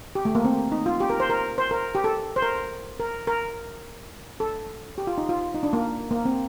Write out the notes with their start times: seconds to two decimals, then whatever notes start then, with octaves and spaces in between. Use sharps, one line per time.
0.15 G4
0.25 A3
0.35 A#3
0.45 C4
0.72 D#4
0.86 F4
1.00 G4
1.10 A#4
1.20 C5
1.30 A#4
1.58 C5
1.71 A#4
1.95 G4
2.04 A4
2.36 C5
2.42 A#4
3.00 A#4
3.27 A#4
4.40 A4
4.98 G4
5.07 F4
5.18 D#4
5.29 F4
5.55 D#4
5.63 D4
5.73 A#3
6.11 A#3
6.25 C4